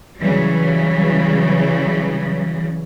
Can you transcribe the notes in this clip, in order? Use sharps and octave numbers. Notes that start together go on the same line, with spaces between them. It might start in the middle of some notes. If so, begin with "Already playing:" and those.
C#3 E3 F#3 G3